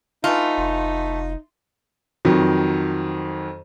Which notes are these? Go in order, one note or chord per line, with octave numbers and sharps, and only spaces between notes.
E3 A3 D#4 F4
F1
F2 D#3 F#3